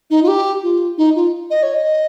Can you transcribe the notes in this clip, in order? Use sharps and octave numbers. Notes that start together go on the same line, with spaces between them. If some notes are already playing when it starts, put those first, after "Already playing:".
D#4
F4
G4
F4
D#4
F4
D#5
C#5
D#5